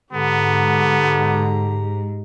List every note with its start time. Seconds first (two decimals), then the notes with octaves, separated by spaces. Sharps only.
0.13 G#2 D3 B3 G4 A#5